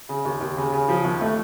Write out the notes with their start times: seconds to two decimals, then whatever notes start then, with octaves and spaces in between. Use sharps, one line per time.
0.09 C#3
0.25 D#2
0.41 D#2
0.57 C#3
0.72 C#3
0.88 F3
1.04 D#2
1.21 A3